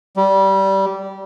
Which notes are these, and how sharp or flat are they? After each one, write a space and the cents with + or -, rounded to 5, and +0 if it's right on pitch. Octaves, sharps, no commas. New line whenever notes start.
G3 -20